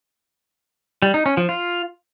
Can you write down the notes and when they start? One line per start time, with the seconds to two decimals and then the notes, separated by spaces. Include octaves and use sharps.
1.02 G3
1.14 D#4
1.26 C#4
1.37 F3
1.49 F4